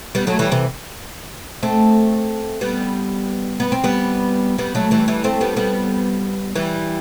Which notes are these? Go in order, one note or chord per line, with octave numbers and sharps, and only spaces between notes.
G3 B3
F#3 A3
E3 G3
C3 E3
A3 C4
G3 B3
B3
C4
G3 B3
G3 B3
F#3 A3
E3 G3
E3 G3
A3 C4
G3 B3
G3 B3
E3 G3